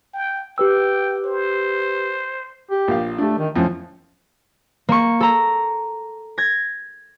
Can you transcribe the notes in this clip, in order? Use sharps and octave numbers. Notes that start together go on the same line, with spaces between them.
G5
G4 B4 G5 E6
C5
G4
A#1 F5
A3 D4 G4
D#3
F2 A2 F3 C#4
A#3 C#6
A4 A#5
G#6 A#6